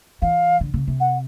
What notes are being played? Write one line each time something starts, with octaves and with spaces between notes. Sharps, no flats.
E3 F5
D3
C#3
C3
F#5